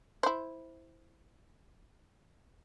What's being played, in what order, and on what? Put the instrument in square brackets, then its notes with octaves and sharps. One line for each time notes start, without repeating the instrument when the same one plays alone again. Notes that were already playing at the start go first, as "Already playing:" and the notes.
[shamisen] E4 C5